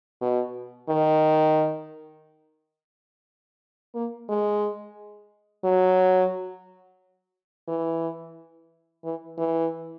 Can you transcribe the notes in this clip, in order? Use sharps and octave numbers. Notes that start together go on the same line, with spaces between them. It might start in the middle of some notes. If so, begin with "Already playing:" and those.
B2
D#3
A#3
G#3
F#3
E3
E3
E3